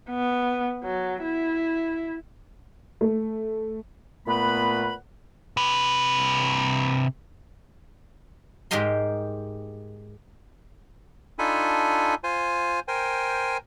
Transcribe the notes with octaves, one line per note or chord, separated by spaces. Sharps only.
B3
F#3
E4
A3
A#2 A3 B3 B4 F#5 B5
C3 B4
G#2 G#3 G4 A#4 D#5 C6
D4 D#4 F4 A4 G#5 B5
F4 C5 G#5
A#4 C5 G5 G#5